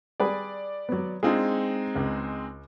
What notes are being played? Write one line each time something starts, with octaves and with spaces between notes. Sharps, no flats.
G3 G#4 B4 D5
F#3 B3
G#3 C4 D4 D#4 F4 G#4
C#2